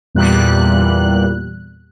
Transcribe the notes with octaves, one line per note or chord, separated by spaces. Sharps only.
E2 A#2 G3 F#6